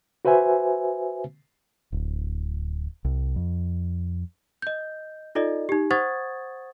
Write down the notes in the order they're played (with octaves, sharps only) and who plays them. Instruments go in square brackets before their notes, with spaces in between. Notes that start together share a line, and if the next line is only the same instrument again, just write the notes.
[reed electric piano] F#4 B4 C5 E5 G#5
[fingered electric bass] D1
C2
F2
[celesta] D#5 G6
D#4 F4 A4 D5 D#5
D#4 G4
C5 F#5 C#6 D#6 G#6 A6